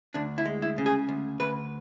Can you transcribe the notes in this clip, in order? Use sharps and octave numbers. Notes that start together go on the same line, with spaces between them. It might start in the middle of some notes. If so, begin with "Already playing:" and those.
D2 D4
E4
G#3
E4
C#3
G#4
D2
D2 B4